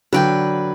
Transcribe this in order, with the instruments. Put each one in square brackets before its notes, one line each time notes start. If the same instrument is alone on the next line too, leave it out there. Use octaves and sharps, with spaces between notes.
[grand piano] D3 F#3 [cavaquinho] B4 D5 G5